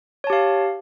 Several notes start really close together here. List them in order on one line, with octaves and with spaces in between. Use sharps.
C#5 A5 G4 F5